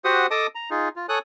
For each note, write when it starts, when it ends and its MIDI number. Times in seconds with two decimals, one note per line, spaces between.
0.05 0.27 66
0.05 0.27 67
0.05 0.27 72
0.05 0.27 78
0.05 0.27 87
0.31 0.47 69
0.31 0.47 75
0.31 0.47 81
0.31 0.47 86
0.31 0.47 87
0.55 0.70 82
0.71 0.89 63
0.71 0.89 65
0.71 0.89 68
0.96 1.06 65
1.09 1.19 69
1.09 1.19 73
1.09 1.19 80
1.09 1.19 87
1.09 1.19 90